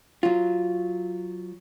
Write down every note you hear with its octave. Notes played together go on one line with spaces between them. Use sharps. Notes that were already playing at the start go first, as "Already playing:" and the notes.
F#3 F4